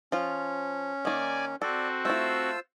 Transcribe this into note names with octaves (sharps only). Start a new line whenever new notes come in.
F3 C#4 F4
D#3 A#3 D5 G#5
C4 F#4 A4 D5
A3 E4 F4 C5 E6